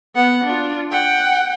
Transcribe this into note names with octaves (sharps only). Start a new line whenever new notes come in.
B3 F#5
D4 F4
F#5 G5